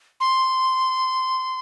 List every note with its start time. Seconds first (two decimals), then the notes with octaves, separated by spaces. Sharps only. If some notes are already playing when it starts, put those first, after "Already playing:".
0.20 C6